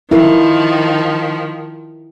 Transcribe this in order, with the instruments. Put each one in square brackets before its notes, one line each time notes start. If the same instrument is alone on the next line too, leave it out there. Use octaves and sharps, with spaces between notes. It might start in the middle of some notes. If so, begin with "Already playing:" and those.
[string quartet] D#3 F3 [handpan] E4 A#4